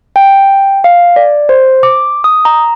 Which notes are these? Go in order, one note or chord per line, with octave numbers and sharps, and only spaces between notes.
G5
F5
D5
C5
D6
D#6
A#5